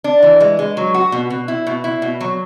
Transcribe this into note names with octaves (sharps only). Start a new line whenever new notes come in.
D4
E3
G#3
G#3
F#3
F#4
B2
B2
E4
B2
E4
B2
F#3